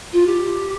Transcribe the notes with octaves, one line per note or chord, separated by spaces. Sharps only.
F4
G4